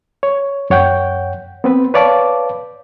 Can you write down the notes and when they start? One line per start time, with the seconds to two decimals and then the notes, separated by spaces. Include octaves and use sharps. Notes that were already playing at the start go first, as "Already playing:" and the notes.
0.23 C#5
0.70 F#2 C#5 F#5 G5 G6
1.64 B3 C4 B4
1.94 B4 C#5 D5 F5 A5 D6